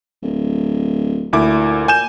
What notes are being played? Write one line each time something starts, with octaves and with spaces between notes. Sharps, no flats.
D1
D2 A#2 E4 D6
G#5 G6 E7